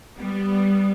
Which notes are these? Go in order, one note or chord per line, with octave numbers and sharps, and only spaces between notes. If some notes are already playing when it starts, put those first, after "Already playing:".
G3 B3